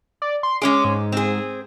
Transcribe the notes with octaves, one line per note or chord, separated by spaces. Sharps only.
D5
C6
G#3 C#4 G#4 D6
G#2
C4 G#4